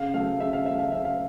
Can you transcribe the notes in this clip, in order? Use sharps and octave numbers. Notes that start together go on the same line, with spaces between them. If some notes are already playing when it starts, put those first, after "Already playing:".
Already playing: C#3 F5
F#3 A3 F5
C#3 E5
F5
F#3 A3 E5
F5
C#3 E5
F5